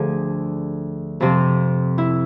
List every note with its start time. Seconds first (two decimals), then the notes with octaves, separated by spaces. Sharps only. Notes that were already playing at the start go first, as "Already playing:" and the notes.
Already playing: D2 D3 F3 G#4
1.20 F2 C3 F3
1.98 E4